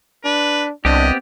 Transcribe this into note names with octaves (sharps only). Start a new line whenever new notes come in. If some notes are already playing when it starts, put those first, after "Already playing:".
D4 B4
C2 B3 C4 D4 G4 D#5